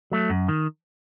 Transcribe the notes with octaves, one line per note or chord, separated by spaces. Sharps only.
F#3 A3
F#2
D#3